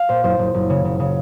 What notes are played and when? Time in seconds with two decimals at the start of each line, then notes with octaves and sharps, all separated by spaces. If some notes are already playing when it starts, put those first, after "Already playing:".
Already playing: F5
0.09 A#2 C5
0.24 F#1 C5
0.39 F#1
0.54 F#1
0.70 C#3
0.85 C#3
1.00 C#3